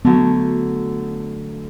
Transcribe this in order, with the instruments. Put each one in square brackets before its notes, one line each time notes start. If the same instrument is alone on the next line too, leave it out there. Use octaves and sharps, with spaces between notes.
[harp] D3 F#3 A3 [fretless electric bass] B3